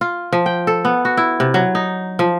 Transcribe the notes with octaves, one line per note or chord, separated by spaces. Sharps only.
F4
F3
G5
A4
B3
F#4
E4
C3
F#3
D#4
F3